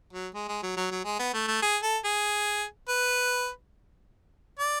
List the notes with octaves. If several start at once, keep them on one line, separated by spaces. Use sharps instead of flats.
F#3
G#3
G#3
F#3
F#3
F#3
G#3
B3
A3
A3
G#4
A4
G#4
B4
D5